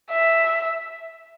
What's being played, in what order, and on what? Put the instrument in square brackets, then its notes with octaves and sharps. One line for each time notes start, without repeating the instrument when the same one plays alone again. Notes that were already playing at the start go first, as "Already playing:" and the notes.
[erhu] E5